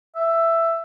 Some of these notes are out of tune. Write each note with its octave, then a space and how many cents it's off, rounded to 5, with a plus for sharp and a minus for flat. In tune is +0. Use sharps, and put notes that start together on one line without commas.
E5 +10